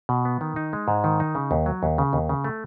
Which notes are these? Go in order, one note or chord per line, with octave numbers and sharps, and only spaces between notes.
B2
B3
D#3
D#4
G#3
G#2
D#3
D#4
C#3
D#2
F#3
D#2
C#3
D#2
C#3
A3